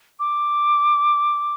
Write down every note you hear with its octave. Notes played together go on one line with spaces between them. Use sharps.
D6